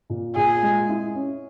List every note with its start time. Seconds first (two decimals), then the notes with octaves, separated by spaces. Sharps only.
0.10 A#2
0.35 A#2 G#4
0.63 G#3
0.89 E4
1.15 C#4